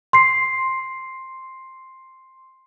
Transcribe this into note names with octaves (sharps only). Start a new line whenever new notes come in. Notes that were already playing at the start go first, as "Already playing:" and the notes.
C6 C7